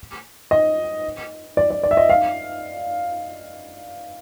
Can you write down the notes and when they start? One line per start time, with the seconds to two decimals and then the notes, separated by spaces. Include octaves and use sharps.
0.51 D#5
1.57 D5
1.70 D5
1.83 D5
1.91 E5
1.97 D#5
2.09 F5